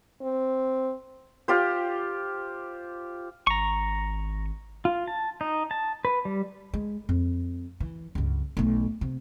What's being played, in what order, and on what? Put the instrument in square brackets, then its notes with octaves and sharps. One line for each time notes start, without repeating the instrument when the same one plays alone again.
[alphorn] C4
[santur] F4 G4 C5
[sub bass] G#1 [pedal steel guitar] A#5 C#6
[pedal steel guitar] F4
A5
D#4
A5
B4
G3
[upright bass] G#3
F2
E3
C#2 G2
B1 A3
C3